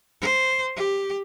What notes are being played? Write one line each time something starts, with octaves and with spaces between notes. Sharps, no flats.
C5
G4